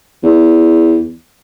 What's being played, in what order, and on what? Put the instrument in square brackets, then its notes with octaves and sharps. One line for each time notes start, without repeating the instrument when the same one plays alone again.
[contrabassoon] E2